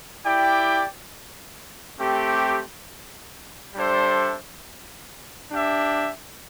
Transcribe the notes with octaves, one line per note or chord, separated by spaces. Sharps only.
E4 G4 D5 G5
A3 C4 G4
G3 D4 A4 C5 E5
D4 G4 E5